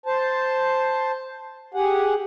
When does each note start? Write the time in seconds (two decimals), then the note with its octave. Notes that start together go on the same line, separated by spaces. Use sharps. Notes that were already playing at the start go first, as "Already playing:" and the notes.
0.06 C5 A5
1.74 G4 G#4 F#5